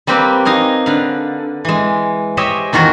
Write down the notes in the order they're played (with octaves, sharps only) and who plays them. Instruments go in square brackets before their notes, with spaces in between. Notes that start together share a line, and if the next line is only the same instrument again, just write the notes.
[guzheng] G3 A#3 C4 G4 B4
D#4 D#5 F5 G#5
D3 B4 F5
E3 G#3
G4 G#4 C5 C#5 D#5 E5
E2 D#3 F4 F#4 A#4